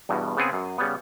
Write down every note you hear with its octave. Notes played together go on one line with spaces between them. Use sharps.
E2 G2 B2
C#3 B3 C4 G#4
F#2
C#3 G3 B3